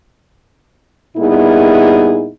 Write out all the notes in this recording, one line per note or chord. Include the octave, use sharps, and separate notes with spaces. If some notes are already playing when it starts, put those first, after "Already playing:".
A#2 G3 B3 D#4 E4 G#4